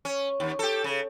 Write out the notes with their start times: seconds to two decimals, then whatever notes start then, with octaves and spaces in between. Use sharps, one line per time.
0.05 C#4
0.40 D#2
0.59 G4 A4
0.84 C#3